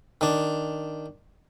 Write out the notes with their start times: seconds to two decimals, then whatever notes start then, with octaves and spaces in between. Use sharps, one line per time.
0.21 D#3 D4